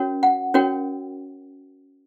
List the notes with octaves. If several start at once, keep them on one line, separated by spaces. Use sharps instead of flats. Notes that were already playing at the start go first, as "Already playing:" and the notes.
Already playing: C#4 F#4 A#4 C#5
F#5
C#4 F#4 A#4 C#5 G5